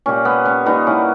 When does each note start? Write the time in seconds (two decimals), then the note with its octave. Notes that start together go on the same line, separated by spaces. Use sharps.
0.06 A#2 G3 C#4
0.25 B3
0.46 C#4
0.66 A#2 G3 B3 D#4
0.87 C#4 E4